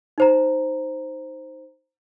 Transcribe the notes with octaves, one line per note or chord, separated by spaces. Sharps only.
D#4 C5 A#5